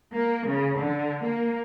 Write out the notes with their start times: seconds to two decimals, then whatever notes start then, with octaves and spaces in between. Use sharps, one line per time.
0.15 A#3
0.47 C#3
0.79 D3
1.25 A#3